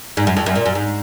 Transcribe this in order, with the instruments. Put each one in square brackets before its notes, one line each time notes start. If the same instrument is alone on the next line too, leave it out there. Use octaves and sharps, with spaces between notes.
[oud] G#2
F#2
F2
F#2
A#2
F#2
G#2